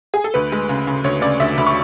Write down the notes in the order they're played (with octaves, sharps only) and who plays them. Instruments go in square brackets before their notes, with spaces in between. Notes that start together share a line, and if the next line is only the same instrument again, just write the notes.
[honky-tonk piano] G#4
A4
D2 B4
G#3
C#3
C#3
D2 C#5
C#3 D5
D2 E5
D2 B5
C#6